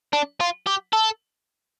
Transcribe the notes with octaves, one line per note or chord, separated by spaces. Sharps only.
D4
F4
G4
A4